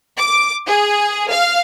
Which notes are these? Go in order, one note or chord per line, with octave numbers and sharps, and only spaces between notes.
D6
G#4
F5